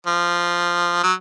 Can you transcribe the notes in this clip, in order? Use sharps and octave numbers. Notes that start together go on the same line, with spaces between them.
F3
F#3